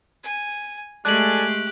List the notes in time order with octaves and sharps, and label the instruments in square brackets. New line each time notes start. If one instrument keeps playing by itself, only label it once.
[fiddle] G#5
[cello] G#3 A3 [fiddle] G4 [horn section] A4 D5 G#5 [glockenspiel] F#6 F#7